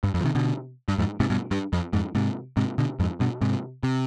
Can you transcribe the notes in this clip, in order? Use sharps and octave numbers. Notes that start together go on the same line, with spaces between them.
G2
F2
F3
C3 D#3
B2 D3
G2
F2 G#2
G#2 C3
G2 B2
G2
F2
F2 G#2
G#2 C3
G#2 C3
B2 D3
F2 G#2
G2 B2
G#2 C3
C3